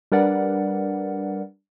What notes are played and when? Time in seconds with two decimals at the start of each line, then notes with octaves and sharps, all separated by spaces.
0.12 G3 D4 A#4 B4 D5 F#5